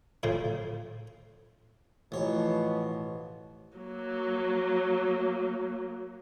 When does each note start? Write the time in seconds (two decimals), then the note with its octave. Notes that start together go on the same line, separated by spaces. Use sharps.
0.23 A2 C#3 F3
2.12 A1 B2 F3 C#5
3.77 F#3 A#3